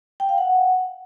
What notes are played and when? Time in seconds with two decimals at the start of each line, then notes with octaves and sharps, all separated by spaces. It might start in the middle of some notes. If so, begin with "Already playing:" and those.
0.20 G5
0.29 F5
0.38 F#5